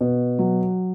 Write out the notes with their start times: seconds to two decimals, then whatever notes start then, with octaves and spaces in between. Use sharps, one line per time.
0.01 B2
0.39 F#3